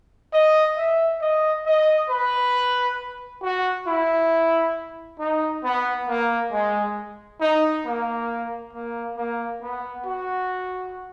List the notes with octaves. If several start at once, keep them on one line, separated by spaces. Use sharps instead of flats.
D#5
E5
D#5
D#5
B4
F#4
E4
D#4
B3
A#3
G#3
D#4
A#3
A#3
A#3
B3
F#4